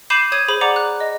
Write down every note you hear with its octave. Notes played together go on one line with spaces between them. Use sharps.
B5 D6 G6 C7 D#7 E7
C#5 D#6 G#6 D#7
G#4 C5 B5
D5 F#5 A#5 D6
F#6
D#5